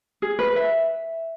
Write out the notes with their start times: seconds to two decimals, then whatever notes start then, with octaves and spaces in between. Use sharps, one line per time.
0.22 G#4
0.39 B4
0.56 E5